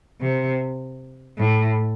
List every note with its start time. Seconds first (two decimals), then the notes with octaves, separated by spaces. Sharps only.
0.21 C3
1.38 A2